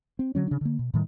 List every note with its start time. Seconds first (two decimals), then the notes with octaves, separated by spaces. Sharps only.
0.19 C4
0.35 D3 F#3 C#4
0.47 C#3 D4
0.61 D3 A#3
0.79 B2
0.94 A2 D#3 G3